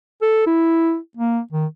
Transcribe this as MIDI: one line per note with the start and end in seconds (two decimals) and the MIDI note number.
0.22 0.45 69
0.47 0.97 64
1.17 1.40 58
1.52 1.66 51